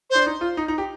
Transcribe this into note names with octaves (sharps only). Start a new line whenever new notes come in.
D4 C5
D#4
F4
D#4
D#4
G4